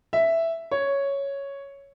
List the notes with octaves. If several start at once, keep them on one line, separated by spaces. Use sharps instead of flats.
E5
C#5